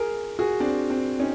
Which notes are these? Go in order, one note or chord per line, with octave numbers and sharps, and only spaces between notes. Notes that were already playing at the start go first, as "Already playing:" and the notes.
Already playing: G#4 A#4
F#4 G#4
C4 D4
C4 D4
C#4 D#4